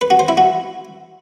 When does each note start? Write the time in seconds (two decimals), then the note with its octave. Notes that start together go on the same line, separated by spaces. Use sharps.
0.01 B4
0.10 F#4
0.19 C5
0.28 E4
0.37 F#4